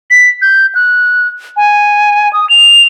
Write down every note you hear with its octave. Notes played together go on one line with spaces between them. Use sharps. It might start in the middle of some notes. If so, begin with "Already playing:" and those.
B6
G6
F#6
G#5
D#6
F7